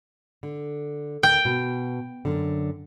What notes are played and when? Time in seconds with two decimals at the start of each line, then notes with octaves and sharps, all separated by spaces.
0.43 D3
1.23 D2 G5
1.45 B2
2.25 F#2 D3